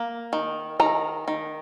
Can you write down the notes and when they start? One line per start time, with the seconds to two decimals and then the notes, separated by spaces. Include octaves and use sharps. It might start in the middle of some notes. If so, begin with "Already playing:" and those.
Already playing: A#3
0.33 D#3
0.80 D#3 A#5
1.28 D#3